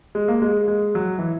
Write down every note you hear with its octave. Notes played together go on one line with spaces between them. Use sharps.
G#3
A#3
G#3
G#3
F#3
E3